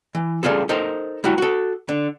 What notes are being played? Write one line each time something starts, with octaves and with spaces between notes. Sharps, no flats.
E3
C#3 G3 F4 G#4 A4
D#4 A4 A#4 C5
G3 E4 F#4
F#4 A4
D3